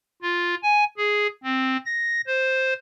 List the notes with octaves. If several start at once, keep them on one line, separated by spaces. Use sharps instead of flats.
F4
G#5
G#4
C4
A#6
C5